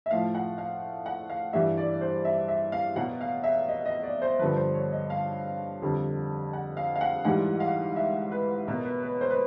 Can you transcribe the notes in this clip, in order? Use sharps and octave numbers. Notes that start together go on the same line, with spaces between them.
E5
A2 F3 F5
F#5
F5
F#5
F5
G2 E3 G3 E5
D5
C5
E5
E5
F5
B2 F#3 F#5
F5
E5
D#5
D#5
D5
C5
G2 D3 F3 B4
C5
C#5
D#5
F5
F2 D3 G3
F#5
F5
F5
F#5
G#2 E3 G3 F#5
F5
E5
B4
B2 F#3 A#4
B4
B4
C5
B4